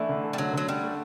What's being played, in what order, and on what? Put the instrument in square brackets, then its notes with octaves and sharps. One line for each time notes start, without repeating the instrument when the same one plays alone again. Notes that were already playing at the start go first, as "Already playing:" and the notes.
Already playing: [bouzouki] E3 [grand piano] A3 D4
[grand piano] D3
A4
[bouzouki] G3
[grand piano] D3 [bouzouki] F#3
[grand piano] D3 [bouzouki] F#3
[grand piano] D3 [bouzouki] G3
[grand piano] A3